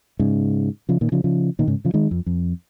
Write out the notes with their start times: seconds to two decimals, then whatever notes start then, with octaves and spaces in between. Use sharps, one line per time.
0.20 G#2 C#3
0.89 C#3 F3
1.01 A#2 D#3
1.12 C#3 F3
1.24 C#3 F3
1.59 A#2 D#3
1.67 G#2 C#3
1.85 C#3 F3
1.94 D#3 G#3
2.11 F2
2.26 F2